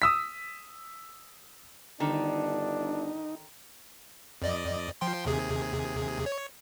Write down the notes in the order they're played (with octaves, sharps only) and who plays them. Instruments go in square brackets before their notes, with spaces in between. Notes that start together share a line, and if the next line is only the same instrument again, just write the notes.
[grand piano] D#6 E6 B6
[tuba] G1 [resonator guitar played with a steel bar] D3 D#3 [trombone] D4 [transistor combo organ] D#4
[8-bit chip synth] F2 D5 D#5
F3 G5 C6
D#2 C3 G#4
C#5